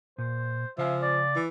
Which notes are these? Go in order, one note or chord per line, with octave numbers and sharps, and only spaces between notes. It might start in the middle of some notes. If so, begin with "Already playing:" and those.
A#2 C5
C#3 F3 E5 F5 G#5
D5
E3